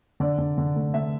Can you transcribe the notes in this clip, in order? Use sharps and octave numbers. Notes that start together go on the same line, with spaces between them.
D3 D5
D3
D3
A3
A3 E5